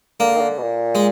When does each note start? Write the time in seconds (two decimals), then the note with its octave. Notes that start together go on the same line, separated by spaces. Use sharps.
0.20 D3 A#3
0.37 D#3
0.41 D3
0.58 B2
0.63 A#2
0.95 G#3